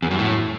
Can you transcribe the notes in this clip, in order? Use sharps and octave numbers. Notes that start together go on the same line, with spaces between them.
E2
F#2
A2